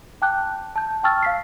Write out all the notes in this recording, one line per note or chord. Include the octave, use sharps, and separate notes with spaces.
G5 A5 D6 F#6 G6
A5 G6
G5 A5 C#6 E6 F6 A6
F5 B6 C7